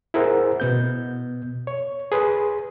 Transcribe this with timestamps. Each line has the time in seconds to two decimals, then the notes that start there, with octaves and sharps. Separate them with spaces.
0.14 E4 G#4 A#4 C5 F#5
0.60 B2 B3 G6
1.67 C#5
2.12 G#4 B4 C6